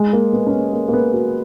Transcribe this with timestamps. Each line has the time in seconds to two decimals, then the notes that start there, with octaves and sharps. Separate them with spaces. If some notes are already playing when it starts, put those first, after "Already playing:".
Already playing: G#3
0.13 A#3
0.33 B3
0.47 C#4
0.53 B3
0.73 A#3
0.88 A#3
0.93 B3
1.13 F#4